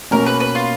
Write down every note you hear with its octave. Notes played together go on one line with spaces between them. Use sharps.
B2 A#3 C#4 A#4
B4
B4
F4